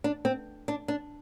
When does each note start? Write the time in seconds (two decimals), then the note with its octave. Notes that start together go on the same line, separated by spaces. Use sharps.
0.04 D4
0.25 C4
0.68 D4
0.88 D4